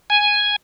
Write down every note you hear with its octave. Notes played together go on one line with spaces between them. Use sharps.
G#5